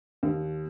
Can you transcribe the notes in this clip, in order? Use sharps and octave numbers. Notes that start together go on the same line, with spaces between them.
D#2